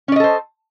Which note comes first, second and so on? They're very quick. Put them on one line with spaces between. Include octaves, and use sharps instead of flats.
C#4 D5 D#5 A4 C5